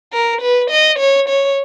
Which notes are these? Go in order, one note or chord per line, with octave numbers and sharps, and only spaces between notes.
A#4
B4
D#5
C#5
C#5